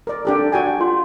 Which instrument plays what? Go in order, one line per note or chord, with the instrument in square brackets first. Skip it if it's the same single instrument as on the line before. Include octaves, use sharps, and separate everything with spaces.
[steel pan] A#4 D5
D4 G4 A4
F#4 G5 G#5
[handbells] F4